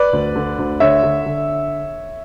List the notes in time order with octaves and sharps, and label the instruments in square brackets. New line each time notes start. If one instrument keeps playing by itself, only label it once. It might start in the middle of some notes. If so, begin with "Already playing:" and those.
Already playing: [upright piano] B4 D5
D2
D3
D2
D3 C#5 E5
D3
D3